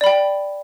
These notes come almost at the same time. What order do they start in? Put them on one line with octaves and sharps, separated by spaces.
D5 B5 G5